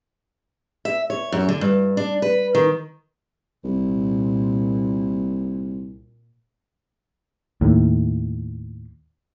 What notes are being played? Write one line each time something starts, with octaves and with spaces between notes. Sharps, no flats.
E5
C#5
F#2
D3
G2
D4
B4
D#3
C2 A#2
D#2 A2